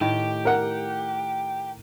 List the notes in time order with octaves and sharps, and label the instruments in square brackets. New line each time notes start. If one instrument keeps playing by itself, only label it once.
[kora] A2 D#3 [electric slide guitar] G4
[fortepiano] A#4 F#5